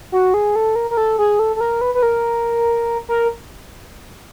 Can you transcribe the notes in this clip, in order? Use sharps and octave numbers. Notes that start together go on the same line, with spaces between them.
F#4
G#4
A4
A#4
A#4
A4
G#4
A4
A4
A#4
B4
B4
A#4
A#4